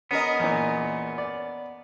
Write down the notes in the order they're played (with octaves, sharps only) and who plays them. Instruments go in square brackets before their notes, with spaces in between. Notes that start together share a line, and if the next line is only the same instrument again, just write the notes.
[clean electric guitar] B3 [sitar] C#4 A#4 D#5
[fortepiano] E2 A#2
D5